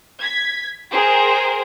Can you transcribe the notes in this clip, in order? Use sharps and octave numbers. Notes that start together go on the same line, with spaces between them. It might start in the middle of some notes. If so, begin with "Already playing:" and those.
G#6 B6
G#4 A#4 C5 G5